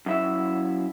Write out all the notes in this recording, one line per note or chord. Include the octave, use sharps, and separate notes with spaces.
F#2 E4 E5